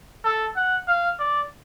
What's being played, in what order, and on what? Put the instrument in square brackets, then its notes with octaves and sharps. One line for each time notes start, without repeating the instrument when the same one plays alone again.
[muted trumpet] A4
F#5
F5
D5